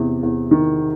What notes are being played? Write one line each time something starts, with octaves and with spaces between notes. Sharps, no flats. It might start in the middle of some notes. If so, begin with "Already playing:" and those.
Already playing: E2 C3
E2
D#3